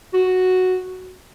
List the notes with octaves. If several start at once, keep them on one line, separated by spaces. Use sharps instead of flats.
F#4